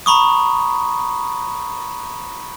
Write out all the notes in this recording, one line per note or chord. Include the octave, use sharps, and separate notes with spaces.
A#5 B5 C#6 D#6